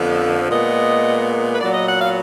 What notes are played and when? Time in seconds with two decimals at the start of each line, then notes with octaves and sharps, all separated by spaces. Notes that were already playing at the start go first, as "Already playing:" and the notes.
Already playing: F2 D3 F3 B3
0.50 A#2 G#3 B3 D#5
1.54 B4
1.60 A#2 F#3 B3 D5
1.74 D#5
1.88 F#5
2.01 F5